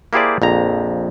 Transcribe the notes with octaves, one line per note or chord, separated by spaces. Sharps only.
A#3 E4 G4 G#4 C5 D5
A#1 F2 A#5